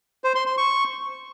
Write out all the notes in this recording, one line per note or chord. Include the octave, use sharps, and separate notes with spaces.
C5
C6
C6
C#6